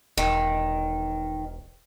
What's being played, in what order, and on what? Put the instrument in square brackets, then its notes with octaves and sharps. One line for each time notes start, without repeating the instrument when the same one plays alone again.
[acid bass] E1 [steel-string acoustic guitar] D#3